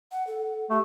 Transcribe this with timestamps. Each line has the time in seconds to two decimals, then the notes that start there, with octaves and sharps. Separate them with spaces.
0.12 F#5
0.27 A4
0.70 A3 G4